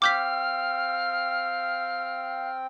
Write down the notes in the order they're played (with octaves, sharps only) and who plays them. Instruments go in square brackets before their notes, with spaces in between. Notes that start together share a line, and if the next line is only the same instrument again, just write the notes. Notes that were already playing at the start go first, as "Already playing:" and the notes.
[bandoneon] C4 G5 [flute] F5 [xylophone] D6 G6 B6 [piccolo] F6